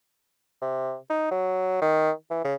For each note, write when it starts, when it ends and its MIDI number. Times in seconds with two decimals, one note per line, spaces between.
0.62 0.96 48
1.10 1.27 63
1.31 1.80 54
1.81 2.11 51
2.30 2.42 52
2.44 2.54 49